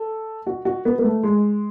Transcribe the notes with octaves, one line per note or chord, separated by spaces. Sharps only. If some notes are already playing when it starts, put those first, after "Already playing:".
Already playing: A4
F#4
F#4
B3
B3
A3
G#3